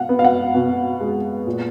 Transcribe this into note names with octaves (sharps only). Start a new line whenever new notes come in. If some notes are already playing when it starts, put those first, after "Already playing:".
Already playing: B2 F5 F#5
B3
F5
F#5
B2
G#3
A#2